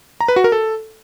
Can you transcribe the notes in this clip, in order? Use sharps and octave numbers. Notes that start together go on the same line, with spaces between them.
A#5
B4
F#4
A#4
A4